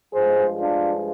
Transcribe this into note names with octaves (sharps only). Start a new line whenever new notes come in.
G2 F3 G#3 G#4 C5
D4 F4